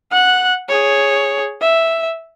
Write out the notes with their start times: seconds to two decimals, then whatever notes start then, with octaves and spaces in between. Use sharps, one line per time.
0.12 F#5 F#6
0.69 G#4 C#5
1.61 E5